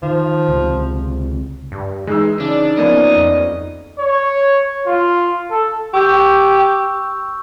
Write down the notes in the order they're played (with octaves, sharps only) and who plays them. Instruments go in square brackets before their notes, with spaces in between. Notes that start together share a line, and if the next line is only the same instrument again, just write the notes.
[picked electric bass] D#3 [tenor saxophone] F3
[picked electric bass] C#2 C3
[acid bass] G2
[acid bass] E3 [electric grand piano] G#3 D#4 E6
[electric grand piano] C#3 [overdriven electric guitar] D4 [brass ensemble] D#4 D5
[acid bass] F3 [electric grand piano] A#3 B3 C#4 [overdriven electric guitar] D#5
[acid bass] F2
[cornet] C#5
F4
A4
[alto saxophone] G4 [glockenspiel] C#6 E6 G6